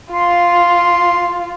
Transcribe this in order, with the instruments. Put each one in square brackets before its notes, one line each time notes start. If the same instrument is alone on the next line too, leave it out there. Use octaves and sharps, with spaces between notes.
[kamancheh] F4 [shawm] C6